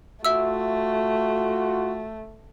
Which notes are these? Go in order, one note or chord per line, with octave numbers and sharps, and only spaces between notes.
A3 F4 F#4 E5 E6